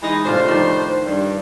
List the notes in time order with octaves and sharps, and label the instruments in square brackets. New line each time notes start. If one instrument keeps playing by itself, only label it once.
[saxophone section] E3 G#3 D#4
[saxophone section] A2 C5 [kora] C3 D4 F4
[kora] D#3 F3 D4
[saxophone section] G2